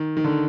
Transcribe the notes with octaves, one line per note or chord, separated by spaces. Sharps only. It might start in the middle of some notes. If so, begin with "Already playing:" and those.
Already playing: D#3
D#3
D3